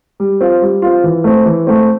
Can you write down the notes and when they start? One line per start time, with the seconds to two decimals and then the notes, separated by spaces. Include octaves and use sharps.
0.20 G3
0.41 C4 F4
0.62 G3
0.82 C4 F4
1.04 E3
1.24 A3 C4
1.46 E3
1.67 A3 C4